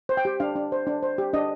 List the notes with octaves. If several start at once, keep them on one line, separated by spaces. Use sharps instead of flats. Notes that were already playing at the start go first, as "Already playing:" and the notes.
C5
G5
G4
D4 F5
D4
C5
D4
C5
G4
D4 D#5